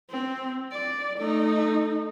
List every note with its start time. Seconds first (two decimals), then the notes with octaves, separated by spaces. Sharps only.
0.10 C4
0.73 D5
1.18 A3 D#4